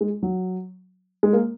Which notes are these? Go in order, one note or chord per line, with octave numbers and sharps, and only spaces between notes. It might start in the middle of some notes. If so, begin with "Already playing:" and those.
G#3
F#3
G#3
A#3